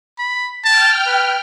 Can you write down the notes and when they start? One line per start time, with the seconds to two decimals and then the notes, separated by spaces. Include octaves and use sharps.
0.19 B5
0.64 G5 A5 F6
1.07 B4